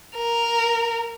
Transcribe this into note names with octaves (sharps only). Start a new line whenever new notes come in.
A#4